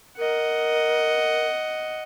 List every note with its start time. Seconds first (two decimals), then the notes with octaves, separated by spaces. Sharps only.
0.18 A#4 D#5 F#5